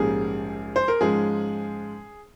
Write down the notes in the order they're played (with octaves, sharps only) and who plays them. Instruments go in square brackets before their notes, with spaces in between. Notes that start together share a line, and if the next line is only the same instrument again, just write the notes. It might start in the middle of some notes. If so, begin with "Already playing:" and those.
Already playing: [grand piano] A#1 G#2 G3 A#3 C#4 G#4
C5
A#4
G#2 F3 G#3 C#4 G#4